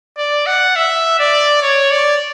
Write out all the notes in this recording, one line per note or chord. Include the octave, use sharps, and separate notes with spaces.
D5
F#5
E5
D5
C#5
D5